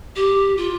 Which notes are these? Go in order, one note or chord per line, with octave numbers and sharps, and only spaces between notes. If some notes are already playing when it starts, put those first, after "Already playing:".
G4
F4